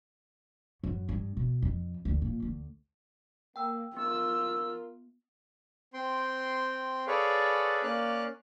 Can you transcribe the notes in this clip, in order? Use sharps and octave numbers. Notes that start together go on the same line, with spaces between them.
F#2
G2
B2
F2
D2
A#2
D2
A#3 G5 E6
B3 F4 A#4 E6
C4 G5 C6
G#4 A4 B4 C#5 D5 F5
A#3 C#4 D5 F5 F#6